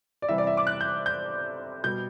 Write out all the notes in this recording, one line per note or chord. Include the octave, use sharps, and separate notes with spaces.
D5
C3 E3 G3 E5
D5
E5
D6
F#6
G6
G6
B2 G3 G6